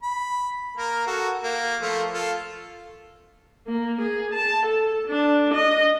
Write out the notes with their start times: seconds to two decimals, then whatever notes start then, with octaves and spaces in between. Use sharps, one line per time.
0.03 B5
0.77 A#3 A#4
1.07 F#4 A4
1.44 A#3
1.81 F3 A3 F4
2.14 F4 A4
3.67 A#3
4.01 G#4
4.33 A5
4.66 A4
5.07 D4
5.54 D#5